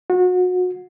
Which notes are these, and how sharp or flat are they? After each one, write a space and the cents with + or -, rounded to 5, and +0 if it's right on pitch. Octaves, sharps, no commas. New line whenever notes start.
F#4 -30